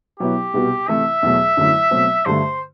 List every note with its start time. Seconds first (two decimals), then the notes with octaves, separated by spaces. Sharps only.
0.20 B2 F#3 B3 E4 G4
0.54 C2 B2 G3 B3 F#4
0.88 C3 E3 A3 E4 E5
1.23 E2 B2 F#3 A3
1.57 F#2 D3 F#3 A3 E4
1.91 B2 F#3 A3 C4
2.26 G2 D3 A3 C5